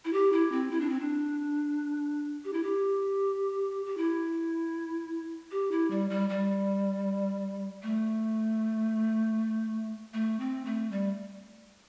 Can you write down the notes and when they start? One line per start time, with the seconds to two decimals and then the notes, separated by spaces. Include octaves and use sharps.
0.05 E4
0.13 G4
0.32 E4
0.52 C4
0.71 E4
0.80 D4
0.89 C4
1.00 D4
2.44 G4
2.53 E4
2.63 G4
3.86 G4
3.97 E4
5.51 G4
5.71 E4
5.90 G3
6.10 G3
6.30 G3
7.83 A3
10.13 A3
10.40 C4
10.65 A3
10.91 G3